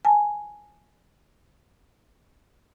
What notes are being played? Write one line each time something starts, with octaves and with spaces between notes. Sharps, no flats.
G#5 A5